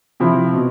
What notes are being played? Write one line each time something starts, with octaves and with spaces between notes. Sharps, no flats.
C3 F3 C4 E4
B2